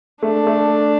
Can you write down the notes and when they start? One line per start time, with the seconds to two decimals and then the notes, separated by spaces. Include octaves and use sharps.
0.23 A3 D4
0.47 A3